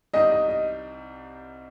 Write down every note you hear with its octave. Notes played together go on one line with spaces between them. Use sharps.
C2 C3 G3 C4 D#4 D#5
D#5
D#5